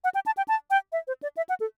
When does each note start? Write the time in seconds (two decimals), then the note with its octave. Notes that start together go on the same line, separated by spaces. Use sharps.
0.04 F#5
0.15 G5
0.26 A5
0.37 G5
0.48 A5
0.70 G5
0.92 E5
1.07 C5
1.23 D5
1.37 E5
1.49 F#5
1.60 A4